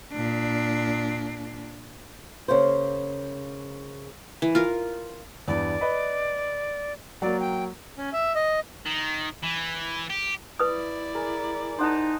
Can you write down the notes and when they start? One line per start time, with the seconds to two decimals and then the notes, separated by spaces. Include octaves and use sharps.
0.12 A#2 D4
2.48 C#3 A#3 C5
4.42 E3
4.55 F4 A#4
5.48 E2 G2 D5
5.81 B4 D#5 B5
7.22 F#3 A#3 D5
7.40 G5
7.98 C#4
8.13 E5
8.35 D#5
8.86 D#3
9.43 E3
10.10 G4
10.59 E4 B4 D5 D#6
11.15 G#4 A#4
11.79 D#4 C5 F#5 A5